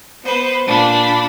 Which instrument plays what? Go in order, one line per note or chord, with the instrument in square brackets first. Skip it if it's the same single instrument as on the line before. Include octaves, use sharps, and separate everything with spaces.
[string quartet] B3 B4 C5
A#2 D4 B5